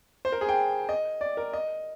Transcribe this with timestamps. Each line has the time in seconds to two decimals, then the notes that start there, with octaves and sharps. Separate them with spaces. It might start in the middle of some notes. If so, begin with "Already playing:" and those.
0.25 C5
0.32 A#4
0.41 G#4
0.49 G5
0.89 D#5
1.21 D5
1.37 A#4
1.53 D#5